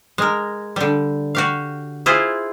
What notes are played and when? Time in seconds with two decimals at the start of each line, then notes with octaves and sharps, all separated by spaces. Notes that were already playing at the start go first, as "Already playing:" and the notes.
0.18 G#3 A#4
0.76 D3 G3
1.35 F#4 G4 F5
2.06 E4 F4 G#4 C5